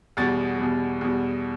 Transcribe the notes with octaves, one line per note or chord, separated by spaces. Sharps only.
E2 B2 G3 A6
E2 B2 G3
E2 B2 G3